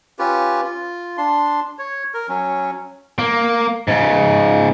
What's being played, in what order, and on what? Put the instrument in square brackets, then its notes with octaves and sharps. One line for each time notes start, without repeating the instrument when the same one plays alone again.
[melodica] C#4 F4 G4 B4
F4
D4 C6
C#5
A#4
F#3 C#4
[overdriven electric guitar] A#3
G#2 C#3